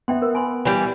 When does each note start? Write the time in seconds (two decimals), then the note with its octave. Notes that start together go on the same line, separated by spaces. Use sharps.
0.08 B3 E5 G5 C6
0.22 A#4
0.35 G#5 B5 C6
0.65 E3 G3